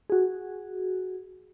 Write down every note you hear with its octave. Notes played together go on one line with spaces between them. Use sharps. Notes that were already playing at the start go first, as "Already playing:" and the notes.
F#4 G#4